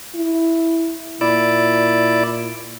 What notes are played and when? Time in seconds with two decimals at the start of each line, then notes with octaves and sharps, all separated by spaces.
0.15 E4
1.21 A#2 E4 D5